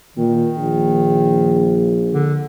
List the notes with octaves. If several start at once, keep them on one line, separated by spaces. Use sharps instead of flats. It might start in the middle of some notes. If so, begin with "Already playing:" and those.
A#2 D#3
A#1
D3